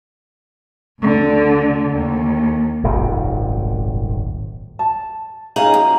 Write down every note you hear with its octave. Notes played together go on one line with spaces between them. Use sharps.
D2 D3
D#2
D#1 G#1 F#2 C3
A5
C#4 D#4 G#4 D#5 F5 F#5 A#5 F#7
F#2